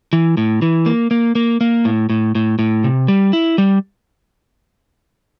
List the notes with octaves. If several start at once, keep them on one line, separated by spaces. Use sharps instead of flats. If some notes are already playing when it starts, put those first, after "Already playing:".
E3
A2
E3
A#3
A#3
A#3
A#3
A2
A2
A2
A2
C3
G3
E4
G3